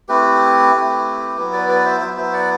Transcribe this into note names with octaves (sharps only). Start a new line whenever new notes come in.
A3 C4 E4 G4 B4
A3 C4 E4
F#3 B3 E4
B4 D5
B4 D5
C5 E5
F#3 B3 E4 C5 E5
C5 E5
D5 F#5